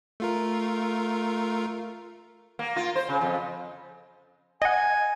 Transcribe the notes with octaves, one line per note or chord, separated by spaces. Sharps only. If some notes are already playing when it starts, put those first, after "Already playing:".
A3 F4 A#4
A#3
F4
C5
C#3
F2
D#5 F#5 G#5